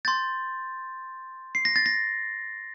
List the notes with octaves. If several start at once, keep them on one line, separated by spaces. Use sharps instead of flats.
C6 G6 A6
C7
A#6
A6
A#6